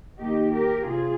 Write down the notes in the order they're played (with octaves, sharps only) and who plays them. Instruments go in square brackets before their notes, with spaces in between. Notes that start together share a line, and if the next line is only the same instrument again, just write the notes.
[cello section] D#3 A#3 D#4 G4
G4 A#4
C3 F4 G#4